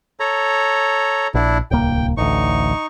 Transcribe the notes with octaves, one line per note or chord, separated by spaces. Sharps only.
A4 C#5 A#5
A#1 D4 E4
D1 C2 A#3 G5
A1 D2 D#4 C#6